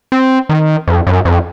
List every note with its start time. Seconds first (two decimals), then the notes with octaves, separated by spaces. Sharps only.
0.12 C4
0.49 D#3
0.88 F2
1.07 F#2
1.25 F2